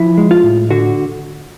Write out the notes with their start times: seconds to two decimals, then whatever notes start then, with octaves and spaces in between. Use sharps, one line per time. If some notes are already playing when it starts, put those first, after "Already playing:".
Already playing: F3 E4
0.18 G#3
0.31 F4
0.43 A2
0.70 D3 F#4